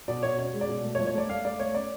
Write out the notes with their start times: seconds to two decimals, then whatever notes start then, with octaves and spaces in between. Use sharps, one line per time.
0.08 B2 D5
0.23 B2 C#5
0.38 C#4 C#5
0.53 G#3
0.61 D5
0.69 B2
0.84 A3
0.95 C#5
0.99 F3
1.07 C#5
1.14 A3 D5
1.29 A3 F5
1.45 A3 D5
1.60 A3 C#5
1.75 C#4 D5